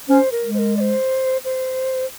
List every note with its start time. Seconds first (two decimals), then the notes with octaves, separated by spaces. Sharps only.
0.09 C#4 C5
0.32 A#4
0.43 G#3
0.54 C5
0.58 A#4
0.77 D5
0.81 C5
1.45 C5